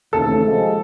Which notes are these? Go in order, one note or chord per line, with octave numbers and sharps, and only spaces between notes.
D#2 C#3 E3 A3 C4 A4
C3 F3 G#3